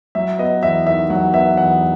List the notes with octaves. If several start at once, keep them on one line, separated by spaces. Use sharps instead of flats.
F#3 E5
B3 D#5
E2 E5
D#3 E5
F#3 F#5
B3 E5
E2 F#5